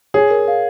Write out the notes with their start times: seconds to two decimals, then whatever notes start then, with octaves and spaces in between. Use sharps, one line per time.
0.14 G#4 C#5
0.30 A#4
0.48 F5